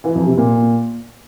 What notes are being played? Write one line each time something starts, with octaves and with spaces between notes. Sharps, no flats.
E3
F2
C3
A#2